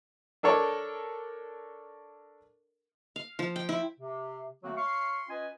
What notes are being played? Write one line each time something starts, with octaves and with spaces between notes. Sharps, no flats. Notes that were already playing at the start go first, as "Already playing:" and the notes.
D4 A4 A#4 C#5 D5
F5
F3
G5
E4
C3
D3 F#3 A3 A#3 C4 F#4
C#5 F5 C6 C#6
C#4 F4 B4 D#5 G#5